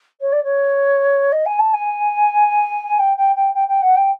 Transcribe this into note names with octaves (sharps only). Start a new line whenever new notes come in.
C#5
D5
C#5
D#5
G#5
A5
G#5
G5
G5
G5
G5
G5
F#5
G5